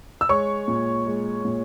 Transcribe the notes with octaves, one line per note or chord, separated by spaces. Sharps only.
E6
G#3 C#5 C#6
A#2
G#3
A#2